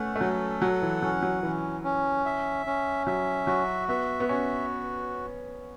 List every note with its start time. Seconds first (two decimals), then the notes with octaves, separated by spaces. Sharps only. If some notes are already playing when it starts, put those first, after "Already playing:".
Already playing: A3 B3 C#4 F#5
0.16 A3
0.21 F#3 A4
0.62 F#3 F#5
0.82 E3
1.02 F#3 C#4
1.23 F#3
1.43 E3 C#4
1.84 C#4
2.25 E5
2.66 C#4
3.07 F#3 E5
3.47 F#3 F#4
3.88 B3 E5
4.20 B3
4.29 C#4 F#4